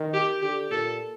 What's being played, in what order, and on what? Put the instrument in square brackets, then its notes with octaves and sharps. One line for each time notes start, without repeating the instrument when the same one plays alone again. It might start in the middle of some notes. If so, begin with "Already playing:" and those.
Already playing: [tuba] D#3
[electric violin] G4
[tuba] D3 [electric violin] G4
[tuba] A#2 [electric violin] A4